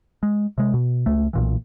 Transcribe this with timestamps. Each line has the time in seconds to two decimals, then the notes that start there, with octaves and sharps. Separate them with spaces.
0.23 G#3
0.58 C3 G#3
0.74 B2
1.06 C#2 A3
1.33 B1 A#2 E3